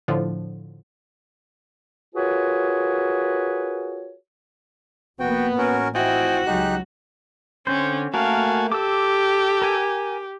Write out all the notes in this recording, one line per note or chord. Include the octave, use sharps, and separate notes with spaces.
A2 D3 F3
F4 F#4 G#4 A#4 B4 C#5
F1 A#3 B3 F#4 G5
A1 C#4 F#4 A#4
F3 C4 E4 F#4 D#5 G5 G#5
C#2 F#3 G#3 D#4 G4 F#6
D3 C4 C#4 C5
A3 A#3 F#4 A#4 F5 G#5 A5
G4 A4 D6 E6
A#4 G#5